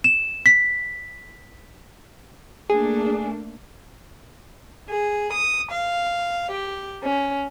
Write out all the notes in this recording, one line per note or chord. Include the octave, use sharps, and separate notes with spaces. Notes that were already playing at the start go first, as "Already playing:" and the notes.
E7
B6
A3 A#3 D4 G#4
G#4
D#6
F5
G4
C#4